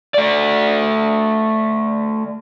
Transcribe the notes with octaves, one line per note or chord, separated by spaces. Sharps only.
A3 D5